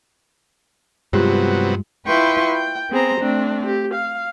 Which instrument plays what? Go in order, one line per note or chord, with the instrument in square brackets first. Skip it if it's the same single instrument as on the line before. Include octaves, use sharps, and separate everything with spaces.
[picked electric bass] G2 G#3 [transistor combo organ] C3 F#3 B3 [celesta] F4 G4 B4
[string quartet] E4 F4 B4 G5 C6 C#6
G5
B3 C4 G#4 C5 A#5
A3 C4 D4
G4
F5